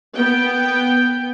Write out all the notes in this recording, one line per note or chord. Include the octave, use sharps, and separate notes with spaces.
B3 G5